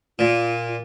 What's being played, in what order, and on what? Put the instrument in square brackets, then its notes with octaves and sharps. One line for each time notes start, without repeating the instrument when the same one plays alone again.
[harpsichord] A#2 [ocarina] F4